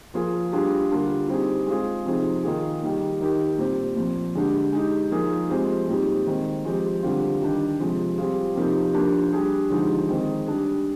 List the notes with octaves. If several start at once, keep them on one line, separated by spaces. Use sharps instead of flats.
F3 A#3 F4 G#4
G3 D4 F4 G#4
D3 G3 A#3 D4 F4
G3 C4 D#4 G#4
G#3 C4 F4 G#4
C3 F3 C4 D#4 G#4
D#3 A#3 F4 G#4
D#3 G3 A#3 D#4
D#3 A#3 D#4 G4
A#2 G3 C4 G4
A#2 F3 C4
D3 G#3 D4 G4
G#3 D#4 G4
F3 A#3 D#4 G#4
F3 G#3 C4 G4
A#2 G3 C4 D#4 G4
D#3 G#3 C4
F3 G#3 C4 G4
D3 G3 C4 F4
D#3 G3 D4 G4
C3 F3 G#3
G3 C4 F4 G#4
C3 F3 A#3 D#4 G4
F3 A#3 D4 G4
G3 D4 G#4
D3 F3 G#3 D#4 G4
D#3 G#3 C4 D#4
G3 D4 G#4